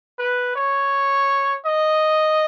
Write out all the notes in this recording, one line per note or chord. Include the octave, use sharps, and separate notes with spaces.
B4
C#5
D#5